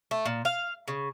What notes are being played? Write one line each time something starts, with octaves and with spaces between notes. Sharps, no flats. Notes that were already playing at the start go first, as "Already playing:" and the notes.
A3
A#2
F5
C#3